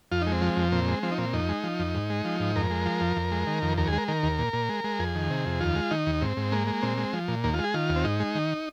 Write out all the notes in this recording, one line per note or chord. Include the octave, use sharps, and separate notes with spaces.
F2 F4
G#3 D#4
C4
F3
F2
A#2 C4
G#3
F3 C4
D#4
A#2 C4
F2 D#4
G#3
F3
F2
G#2
G#3
F3
G#2
F2 A#4
G#3
F3
F2
F2
G#3
D#3
F2
D#2 A#4
G#4
G#3
A#4
D#3 A#4
D#2
A#2
A#2
G#3
G#3
F2 G#4
D#3
C3
F2
D#2 F4
G#3
D#3 D#4
D#2
G#2 C4
G#2
G#3 A#3
G#3
A#2 C4
G#3
F3
A#2
D#2 A#3
F4
G#3
G#4
D#3 F4
D#2
C4
G#2 D#4
G#3
D#3